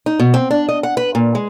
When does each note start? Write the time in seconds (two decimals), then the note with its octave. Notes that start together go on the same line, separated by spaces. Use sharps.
0.06 D#4
0.20 B2
0.34 C4
0.51 D4
0.69 D#5
0.83 F#5
0.97 B4
1.15 A#2
1.35 G#3